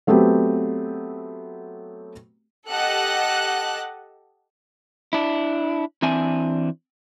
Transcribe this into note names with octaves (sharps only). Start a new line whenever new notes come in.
F#3 A3 B3 C4 G4
G4 A4 D#5 F#5 A5 F#6
D4 E4
E3 C4 D4 E5 G#5